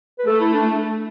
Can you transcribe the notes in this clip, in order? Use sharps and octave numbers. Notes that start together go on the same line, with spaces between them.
B4
A3 A4
E4
D4